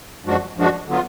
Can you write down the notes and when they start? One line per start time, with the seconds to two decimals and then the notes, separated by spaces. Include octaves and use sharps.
0.25 F#2 F3 G#3 D4 F#4
0.56 F#2 F3 G#3 D4 F#4
0.87 D3 F#3 B3 F4